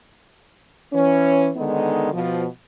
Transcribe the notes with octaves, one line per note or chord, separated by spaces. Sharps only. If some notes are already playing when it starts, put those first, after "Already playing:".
E3 C#4
D3 D#3 G#3 B3 D#4
B2 F3